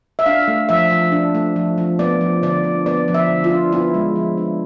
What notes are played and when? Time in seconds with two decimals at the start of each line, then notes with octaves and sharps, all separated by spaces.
0.19 E5
0.26 D4 F5
0.48 A3
0.69 F3 E5
0.91 F3
1.12 D4
1.35 A3
1.56 F3
1.78 F3
1.99 B3 D5
2.21 F3
2.43 D3 D5
2.64 D4
2.86 B3 D5
3.08 F3
3.14 E5
3.29 D3
3.44 F4
3.51 D4
3.72 B3 E4
3.94 G#3
4.16 F3
4.37 D4